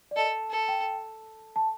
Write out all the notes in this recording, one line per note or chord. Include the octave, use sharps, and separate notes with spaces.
D5
A4 D#5
A4
G5
A5